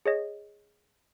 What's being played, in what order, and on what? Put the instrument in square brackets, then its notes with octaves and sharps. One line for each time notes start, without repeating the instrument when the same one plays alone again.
[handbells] G#4 C#5 D#5